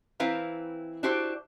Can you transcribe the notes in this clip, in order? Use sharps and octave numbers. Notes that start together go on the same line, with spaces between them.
E3 C4 E4 B4 F5 A#5
D4 E4 F#4 G4 C5 D5